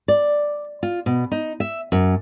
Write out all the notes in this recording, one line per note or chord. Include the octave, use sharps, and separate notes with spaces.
D5
F4
B2
D#4
E5
F#2